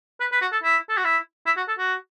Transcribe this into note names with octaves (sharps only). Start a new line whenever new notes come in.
B4
B4
F#4
A4
E4
A4
F#4
E4
E4
F#4
A4
F#4